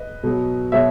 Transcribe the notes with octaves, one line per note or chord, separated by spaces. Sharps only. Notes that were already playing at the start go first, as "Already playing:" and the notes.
Already playing: B4 D#5
B2 F#3
B2 F#3 C#5 E5